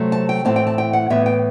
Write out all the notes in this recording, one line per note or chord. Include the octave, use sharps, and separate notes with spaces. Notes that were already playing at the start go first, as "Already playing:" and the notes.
Already playing: C3 F#3 A3 C4
A5
G5
A2 E3 A3 C4 A5
G5
A5
G5
F#5
A2 E3 B3 E5
G5